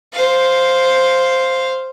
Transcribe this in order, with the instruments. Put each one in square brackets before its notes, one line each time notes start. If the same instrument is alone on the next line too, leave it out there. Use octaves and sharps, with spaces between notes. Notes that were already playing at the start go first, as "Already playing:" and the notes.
[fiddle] C5 F5